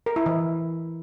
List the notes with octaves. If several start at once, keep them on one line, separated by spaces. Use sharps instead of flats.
A#4
E4
E3